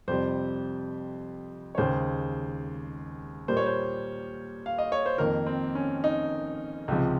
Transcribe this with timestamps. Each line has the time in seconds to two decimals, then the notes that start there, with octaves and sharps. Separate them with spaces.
0.08 F2 C3 G3 C5
1.75 C#5
1.78 D#2 C#3 G#3 C5
3.48 A#2 G3 A#3 C5
3.57 C#5
3.66 C5
4.66 F5
4.78 D#5
4.92 C#5
5.06 C5
5.18 F2 D#3 A#3 A#4
5.46 C4
5.75 C#4
6.04 D#4
6.88 C#2 C3 F3 G#3